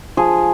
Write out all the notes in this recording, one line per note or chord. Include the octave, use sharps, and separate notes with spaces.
F3 G#4